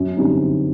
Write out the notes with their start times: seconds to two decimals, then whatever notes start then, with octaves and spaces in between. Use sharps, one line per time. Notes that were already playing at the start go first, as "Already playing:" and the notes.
Already playing: F#2
0.17 D3 G3 C4 D#4